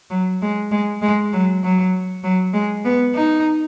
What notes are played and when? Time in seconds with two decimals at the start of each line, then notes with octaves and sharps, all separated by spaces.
0.10 F#3
0.42 G#3
0.71 G#3
1.02 G#3
1.33 F#3
1.64 F#3
2.24 F#3
2.54 G#3
2.85 B3
3.15 D#4